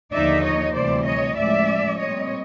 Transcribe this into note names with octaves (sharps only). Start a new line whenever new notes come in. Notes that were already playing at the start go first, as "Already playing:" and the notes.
D#2 D3 F3 A#3 D#4 D5 E5
C#5 D#5
D2 C3 E3 G3 C5 D5
C#5 D#5
A2 F3 G#3 C#4 D5 E5
A#2 G3 C4 C#5 D#5